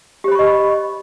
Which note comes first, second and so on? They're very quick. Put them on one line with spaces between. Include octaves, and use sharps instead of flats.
G4 C5 B5 C#6 D#5